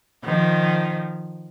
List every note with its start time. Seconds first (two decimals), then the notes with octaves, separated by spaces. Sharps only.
0.24 D#3 F3